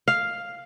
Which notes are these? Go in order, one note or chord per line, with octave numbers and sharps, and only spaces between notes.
F5